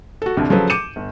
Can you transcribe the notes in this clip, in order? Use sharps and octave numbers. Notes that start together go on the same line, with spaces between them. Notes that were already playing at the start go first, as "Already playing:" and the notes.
F#4 A4
C2 F2 D3
C#3 F3 F#3 A4 B4
D6 G6 C#7 D#7 E7
G1